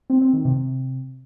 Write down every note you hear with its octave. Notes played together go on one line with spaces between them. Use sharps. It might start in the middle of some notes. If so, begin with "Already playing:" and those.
C4
C4
D#3
C3